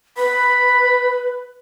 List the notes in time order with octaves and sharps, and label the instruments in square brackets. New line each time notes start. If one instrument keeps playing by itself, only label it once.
[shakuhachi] B4 [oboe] B5